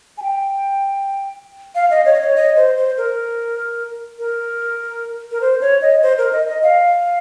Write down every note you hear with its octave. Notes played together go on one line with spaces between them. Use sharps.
G#5
G5
F5
D#5
C#5
D#5
C#5
D#5
C5
C5
A#4
A#4
A#4
C5
C#5
D#5
C5
A#4
D#5
D#5
F5